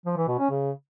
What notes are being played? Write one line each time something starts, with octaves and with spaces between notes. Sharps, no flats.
F3
E3
B2
C#4
C#3